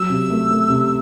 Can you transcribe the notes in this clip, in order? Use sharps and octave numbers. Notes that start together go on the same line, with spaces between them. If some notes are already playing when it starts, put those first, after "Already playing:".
Already playing: F#3 E6
C3
A3
A3
C3